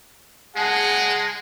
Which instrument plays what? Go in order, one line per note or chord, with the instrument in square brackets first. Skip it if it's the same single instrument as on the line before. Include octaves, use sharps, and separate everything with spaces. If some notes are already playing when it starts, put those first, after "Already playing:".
[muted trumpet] G#3 [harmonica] G#4 F#5 A5